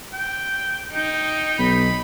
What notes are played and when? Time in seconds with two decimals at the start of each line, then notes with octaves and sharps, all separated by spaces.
0.13 G5
0.94 D#4 G5
1.59 B1 B5